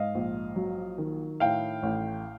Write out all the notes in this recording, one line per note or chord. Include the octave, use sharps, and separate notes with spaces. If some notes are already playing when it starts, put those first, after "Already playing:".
Already playing: G#2 D#5 F5
A#1
F#3
D#3
A2 F5 G5
A1